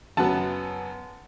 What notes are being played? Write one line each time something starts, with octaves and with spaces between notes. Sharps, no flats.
F#2 C#3 F#3 B3 F#5 A5